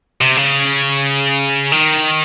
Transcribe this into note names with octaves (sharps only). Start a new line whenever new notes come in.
C3
C#3
D#3